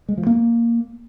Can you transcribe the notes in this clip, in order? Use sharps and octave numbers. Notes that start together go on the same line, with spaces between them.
G#3
F3
A#3